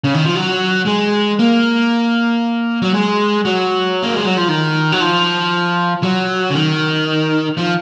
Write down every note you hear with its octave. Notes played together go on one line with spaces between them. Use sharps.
C#3
D#3
F3
F#3
G#3
A#3
F#3
G#3
F#3
A#3
G#3
F#3
F3
D#3
F#3
F3
F#3
C#3
D#3
F3